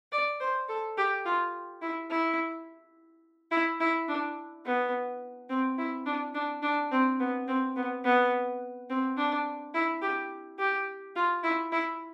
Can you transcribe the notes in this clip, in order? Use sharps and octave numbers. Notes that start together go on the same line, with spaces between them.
D5
C5
A4
G4
F4
E4
E4
E4
E4
D4
B3
C4
E4
D4
D4
D4
C4
B3
C4
B3
B3
C4
D4
E4
G4
G4
F4
E4
E4